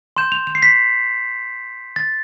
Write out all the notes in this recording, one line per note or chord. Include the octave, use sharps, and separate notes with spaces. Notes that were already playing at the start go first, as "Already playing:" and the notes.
C6 G6 E7
F7
F7
C7
B6
A6